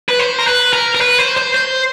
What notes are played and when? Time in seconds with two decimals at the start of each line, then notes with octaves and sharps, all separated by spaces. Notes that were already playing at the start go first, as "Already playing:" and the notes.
0.09 B4
0.19 C5
0.38 A#4
0.46 B4
0.73 A#4
0.95 A#4
1.00 B4
1.19 C5
1.37 C5
1.54 C5